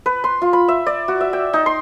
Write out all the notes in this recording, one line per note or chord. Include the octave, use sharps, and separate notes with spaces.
B4
C6
F4
B5
E5
D5
F#4
E5
G5
D#4
C6